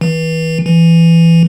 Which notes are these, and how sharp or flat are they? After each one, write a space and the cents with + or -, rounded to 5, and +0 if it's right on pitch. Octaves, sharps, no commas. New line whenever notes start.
E3 -30
E3 +15